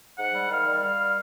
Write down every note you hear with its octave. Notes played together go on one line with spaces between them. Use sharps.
G#2 F#5
G3
D#3 F5
G3
G3 F5